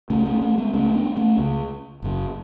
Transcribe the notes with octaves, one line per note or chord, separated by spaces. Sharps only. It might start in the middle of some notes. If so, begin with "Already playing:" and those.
C#2 C#3 A3 C#4
A3 C#4
A3 C#4
G#3 B3
C#2 C#3 A3 C#4
B3 D4
A3 C#4
C#2 C#3
F#1 F#2 C#3